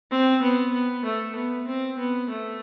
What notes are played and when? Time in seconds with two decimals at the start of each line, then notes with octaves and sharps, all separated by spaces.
0.11 C4
0.42 B3
0.73 B3
1.05 A3
1.36 B3
1.67 C4
1.99 B3
2.30 A3